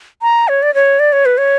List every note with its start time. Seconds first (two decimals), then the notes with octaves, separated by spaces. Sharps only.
0.22 A#5
0.48 C#5
0.63 D5
0.74 C#5
0.99 D5
1.13 C#5
1.26 B4
1.38 C#5